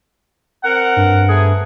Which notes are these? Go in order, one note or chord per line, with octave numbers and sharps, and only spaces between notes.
C4 A#4 F#5
G2
A3 B3 G#4